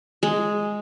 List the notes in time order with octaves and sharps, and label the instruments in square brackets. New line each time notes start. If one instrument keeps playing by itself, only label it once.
[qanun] G#3